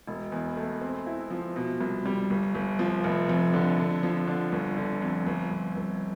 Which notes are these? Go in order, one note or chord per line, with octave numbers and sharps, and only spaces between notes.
E1
E2
A3
C4
E4
F3
B2
C2
G3
G1
G1
F3
F1
F2
D3
D3
F3
D3
G1
D3
F2
G1
G1
G1